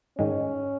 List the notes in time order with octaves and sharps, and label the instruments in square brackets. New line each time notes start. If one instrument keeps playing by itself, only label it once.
[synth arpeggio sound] G#2 D#3 G#3 [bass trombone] C#4